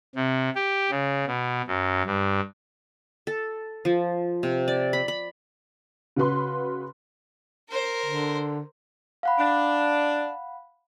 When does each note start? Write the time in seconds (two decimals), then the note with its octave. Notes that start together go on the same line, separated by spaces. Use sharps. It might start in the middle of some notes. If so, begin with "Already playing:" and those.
0.15 C3
0.55 G4
0.91 C#3
1.27 B2
1.67 F#2
2.06 G2
3.27 A4
3.85 F3
4.43 C3
4.68 D5
4.93 B5
5.08 B5
6.16 C#3 F#4 B4 C6
7.69 A#4 C5
8.06 D3
9.23 F5 F#5 B5
9.38 D4